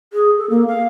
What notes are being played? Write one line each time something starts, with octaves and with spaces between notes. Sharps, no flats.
G#4
A4
A#3
F5